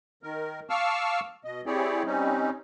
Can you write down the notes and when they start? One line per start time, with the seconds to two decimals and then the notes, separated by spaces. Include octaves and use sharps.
0.23 D#3 A#4
0.70 F5 A5 C#6 D6 E6 F6
1.45 B2 D#5
1.66 C4 E4 G4 G#4 C#5 D5
2.06 G3 C4 C#4 D#4